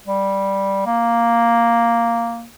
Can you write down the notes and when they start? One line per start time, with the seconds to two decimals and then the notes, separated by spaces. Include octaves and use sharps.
0.07 G3
0.86 A#3